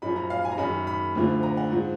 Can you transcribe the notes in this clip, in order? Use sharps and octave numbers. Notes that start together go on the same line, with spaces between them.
F#2 F3 B5
A#5
F5
G#5
A#5
F#2 D#3 B5
B5
D2 D3 F3
A#5
F#5
G#2 F3